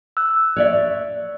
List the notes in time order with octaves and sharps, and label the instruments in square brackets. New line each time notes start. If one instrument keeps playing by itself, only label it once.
[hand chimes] E6 F#6
[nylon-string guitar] C#5 D5 E5